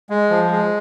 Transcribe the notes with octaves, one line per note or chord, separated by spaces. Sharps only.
G#3
F3
G#3